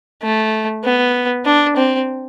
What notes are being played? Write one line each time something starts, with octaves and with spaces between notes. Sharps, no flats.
A3
B3
D4
C4